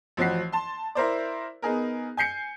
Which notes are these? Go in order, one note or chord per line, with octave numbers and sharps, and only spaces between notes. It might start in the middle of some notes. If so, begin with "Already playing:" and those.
A1 F3 F#4 F#5 C7
A5 C6
E4 A#4 C5 D5
B3 D#4 G#4 A#4
G#5 G6 C7 C#7